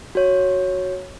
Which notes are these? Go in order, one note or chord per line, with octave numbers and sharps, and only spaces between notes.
F#4 C#5